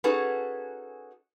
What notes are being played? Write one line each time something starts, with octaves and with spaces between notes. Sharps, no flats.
C#4 D#4 F#4 G#4 A4 B4